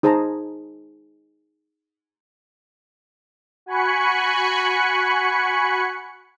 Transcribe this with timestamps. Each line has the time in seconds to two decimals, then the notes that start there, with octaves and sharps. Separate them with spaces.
0.03 D#4 G#4 C5 A5 A#5
3.66 F#4 G#5 B5 C#6 F#6 C#7